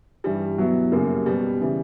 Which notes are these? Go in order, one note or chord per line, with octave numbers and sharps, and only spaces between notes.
G2 E3 G3
B2 F#3 B3 E4
F#2 C#3 G3 A#3
B2 G3 B3
C#3 E3 G3